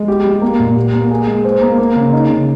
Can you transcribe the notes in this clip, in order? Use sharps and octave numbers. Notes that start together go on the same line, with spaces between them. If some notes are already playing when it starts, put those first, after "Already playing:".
Already playing: G#3
G4
G3
A#3
A#2
G4
A#3
G#4
G#3
C5
A#3
A#3
C#3
D#4
C#3